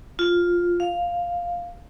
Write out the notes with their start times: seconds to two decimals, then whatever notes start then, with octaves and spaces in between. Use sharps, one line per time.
0.19 F4
0.80 F5